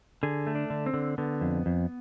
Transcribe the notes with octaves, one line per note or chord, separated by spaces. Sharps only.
D3 G#4
A3
D4
D3
C4
D3
D3 B3
F2
F2